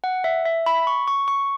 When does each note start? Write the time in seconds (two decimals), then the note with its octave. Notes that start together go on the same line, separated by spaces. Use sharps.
0.04 F#5
0.24 E5
0.45 E5
0.66 B5
0.87 C#6
1.08 C#6
1.28 C#6